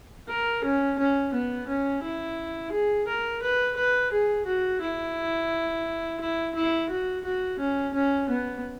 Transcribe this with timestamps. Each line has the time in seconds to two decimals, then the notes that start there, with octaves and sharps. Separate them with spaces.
0.29 A#4
0.64 C#4
0.98 C#4
1.33 B3
1.67 C#4
2.03 E4
2.72 G#4
3.07 A#4
3.42 B4
3.77 B4
4.12 G#4
4.46 F#4
4.81 E4
6.20 E4
6.54 E4
6.89 F#4
7.24 F#4
7.59 C#4
7.94 C#4
8.29 B3